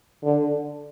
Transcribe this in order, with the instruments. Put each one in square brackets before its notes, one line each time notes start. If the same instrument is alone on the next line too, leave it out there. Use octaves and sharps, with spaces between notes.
[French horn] D3